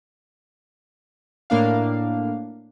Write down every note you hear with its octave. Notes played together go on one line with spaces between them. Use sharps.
A2 A#3 D4 F5